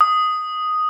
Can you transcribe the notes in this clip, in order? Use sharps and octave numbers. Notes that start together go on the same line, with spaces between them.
D#6